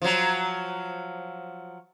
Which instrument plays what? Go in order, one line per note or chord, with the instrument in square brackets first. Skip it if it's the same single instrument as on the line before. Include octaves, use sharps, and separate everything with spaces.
[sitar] F3 F#3